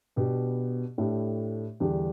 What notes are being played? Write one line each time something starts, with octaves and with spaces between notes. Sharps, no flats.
B2 B3 D4 G4
A2 A3 D4 G4
E2 D3 G3 D4 G4